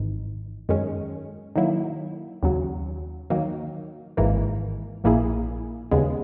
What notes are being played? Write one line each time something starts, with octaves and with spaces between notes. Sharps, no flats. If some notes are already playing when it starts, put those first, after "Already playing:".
Already playing: G#1 G#2 E3 D#4
F#2 D#3 G#3 C#4
D#3 F#3 A#3 E4
D#2 C#3 F#3
D#3 F#3 A#3
G#1 G#2 E3 A#3
A#1 A#2 A#3 E4 G#4
D#2 C#3 G#3 B3